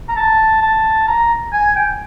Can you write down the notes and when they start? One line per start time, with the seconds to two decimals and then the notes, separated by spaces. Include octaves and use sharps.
0.09 A#5
0.16 A5
0.62 A5
1.08 A#5
1.53 G#5
1.76 G5